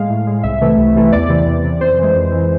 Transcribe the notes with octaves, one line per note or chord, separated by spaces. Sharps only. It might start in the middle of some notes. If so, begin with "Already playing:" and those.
Already playing: A2 G#3 F5
A2
G#3
C2 E5
C3 E3 A3
C2
C3 E3 A3
E2 D5
C3 E3
E2
C3 E3
F2 C5
E3 G#3
F2
E3 G#3